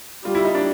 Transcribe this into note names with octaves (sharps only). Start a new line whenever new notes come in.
G3 F4
E4
D#4
D4